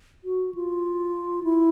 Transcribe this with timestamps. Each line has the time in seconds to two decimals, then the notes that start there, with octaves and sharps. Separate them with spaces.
0.24 F#4
0.54 F4
1.44 E4